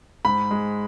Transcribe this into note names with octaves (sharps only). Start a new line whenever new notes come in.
G#2 B5
G#3